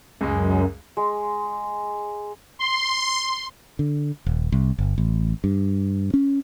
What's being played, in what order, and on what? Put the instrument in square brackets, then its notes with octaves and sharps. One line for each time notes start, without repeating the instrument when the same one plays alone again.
[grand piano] C#2 G#3 [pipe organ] F#2
[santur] G#3
[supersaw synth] C6
[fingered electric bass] D3
D#1
C2
G1
A1
G2
C#4